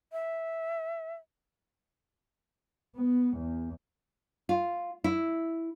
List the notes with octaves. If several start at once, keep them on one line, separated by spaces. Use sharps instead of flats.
E5
B3
E2
F4
E4